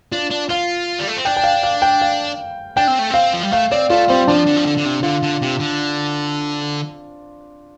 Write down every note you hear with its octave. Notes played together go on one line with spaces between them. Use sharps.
D4 F4
D4
F4 F5
G3
A3
C4
D4 G5
G5
F5
F5
G5
F5
D4 G5
C4
A3
C4 F5
F3
G3
A3 F5
C4 D5
A3 F4
G3 C4
F3 D4
D3
F3
D3
D3
C3
D3 F4
D3
C3
D3